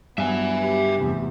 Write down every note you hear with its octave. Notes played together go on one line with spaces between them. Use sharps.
G2 F#3 B3 E5 G#5
G4
F1 E2